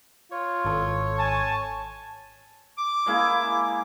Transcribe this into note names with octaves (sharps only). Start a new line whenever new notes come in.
F4 C#5
G#1 A4
G#5 A5
D6
G#3 A#3 E4